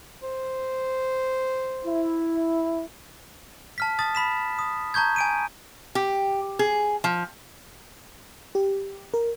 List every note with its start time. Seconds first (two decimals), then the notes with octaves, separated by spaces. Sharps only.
0.23 C5
1.86 E4
3.78 A5 F6 B6
3.99 A5 D#6 A6
4.15 B5 B6 E7
4.59 D#6
4.94 A5 A#5 C#6 G6 G#6
5.16 G#5 D7 D#7
5.95 G4
6.59 G#4
7.04 F3
8.55 G4
9.14 A#4